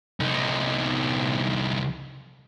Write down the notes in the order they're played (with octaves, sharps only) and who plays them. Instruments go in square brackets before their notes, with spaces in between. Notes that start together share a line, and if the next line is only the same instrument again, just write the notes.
[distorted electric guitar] C2 D#4